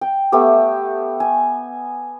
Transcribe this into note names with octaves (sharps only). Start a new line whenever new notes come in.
G5
A3 B3 G4
G#5